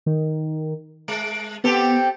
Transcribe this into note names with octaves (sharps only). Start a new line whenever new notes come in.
D#3
G#3 D7
B3 C4 G4 A4